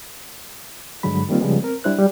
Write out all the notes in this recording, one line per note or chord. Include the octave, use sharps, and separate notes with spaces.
G2 D3 F#3 G#3 B5
D#3 G3 A#3 C4 F4
C#3 F3 G3 G#3 B3
C4 A#4
G3 D4 E4 C5 F#6
G3